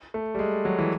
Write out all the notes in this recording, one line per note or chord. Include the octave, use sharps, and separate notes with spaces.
A3
G3
G#3
F#3
E3